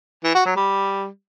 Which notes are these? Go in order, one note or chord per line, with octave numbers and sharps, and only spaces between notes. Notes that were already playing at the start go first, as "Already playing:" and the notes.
E3
F#4
F#3
G3